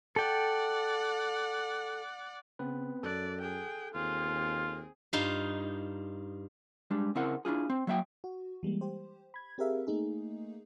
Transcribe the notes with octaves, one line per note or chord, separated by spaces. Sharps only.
A4 D5 F#5 G5
C#3 B3 C4 B4
F#2 A4 D5 F#6
G#4 G5
D#2 C4 F4 G#4
G2 D#4 F4 F5
G3 G#3 D4
C#3 C4 E4 A#4 F#5
D4 E4 F4 G#4
C4
F#3 A#3 E5 F#5 G5
F#4
E3 G3 G#3 A#3
G4 C5
B5 G#6
C4 G4 G#4 A#4 E5 F5
A3 A#3 D#4 G#4